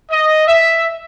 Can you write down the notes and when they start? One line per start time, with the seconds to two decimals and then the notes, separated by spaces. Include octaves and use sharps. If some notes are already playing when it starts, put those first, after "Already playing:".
0.11 D#5
0.47 E5